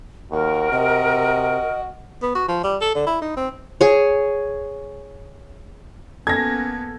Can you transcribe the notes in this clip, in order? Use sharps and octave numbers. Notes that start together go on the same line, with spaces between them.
D#2 F#4 A#4
C3 D#5
B3
F#4
F3
G3
A4
D3
E4
D#4
C4
G#4 C#5
A#3 B3 C#4 A4 G#6 A#6